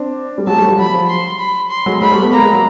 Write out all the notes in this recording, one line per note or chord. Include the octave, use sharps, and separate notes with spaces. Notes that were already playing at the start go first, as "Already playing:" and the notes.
Already playing: C4 D4
G3
F#3 G#3 A5
G3 A3
F3 G3
F#3 B5
F3
C6
B5
C6
F#3 G#3
F#3 G#3 B5
G3 A3
A3 B3
G#3 A#3 A#5
G#3 A#3
F#3